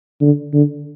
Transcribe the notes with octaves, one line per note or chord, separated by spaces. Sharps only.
D3
D3